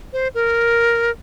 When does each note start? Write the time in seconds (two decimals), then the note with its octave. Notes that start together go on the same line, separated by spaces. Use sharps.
0.13 C5
0.35 A#4